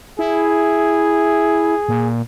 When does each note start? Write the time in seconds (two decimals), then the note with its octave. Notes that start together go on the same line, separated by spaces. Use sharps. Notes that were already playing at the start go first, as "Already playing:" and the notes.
0.19 E4 G#4
1.89 A#2